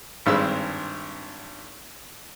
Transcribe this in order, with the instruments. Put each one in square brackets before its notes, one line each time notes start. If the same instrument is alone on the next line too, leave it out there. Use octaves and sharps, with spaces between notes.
[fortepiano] G#1 G2 G3 G#3 C4 E6